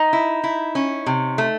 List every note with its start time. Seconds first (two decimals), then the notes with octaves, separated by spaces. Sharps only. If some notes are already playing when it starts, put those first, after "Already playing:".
Already playing: D#4
0.13 E4
0.44 E4
0.75 C#4
1.06 C3
1.38 A3